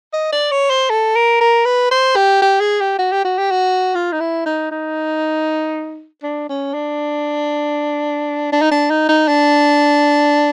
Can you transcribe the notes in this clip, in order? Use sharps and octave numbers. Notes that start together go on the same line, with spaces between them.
D#5
D5
C#5
C5
A4
A#4
A#4
B4
C5
G4
G4
G#4
G4
F#4
G4
F#4
G4
F#4
F4
D#4
E4
D#4
D#4
D4
C#4
D4
D4
D#4
D4
D#4
D#4
D4